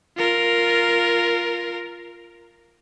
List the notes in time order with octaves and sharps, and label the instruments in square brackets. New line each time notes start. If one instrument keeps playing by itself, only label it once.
[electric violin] F4 A#4